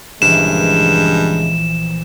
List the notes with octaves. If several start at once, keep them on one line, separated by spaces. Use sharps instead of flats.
A#1 G2 C#3 E3 G#3 E7